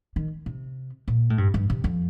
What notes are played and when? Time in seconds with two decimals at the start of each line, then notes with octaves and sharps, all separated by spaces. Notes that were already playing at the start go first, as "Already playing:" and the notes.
0.16 D#3
0.46 C3
1.08 A#2
1.30 A2
1.38 G2
1.54 G2
1.70 C3
1.84 F2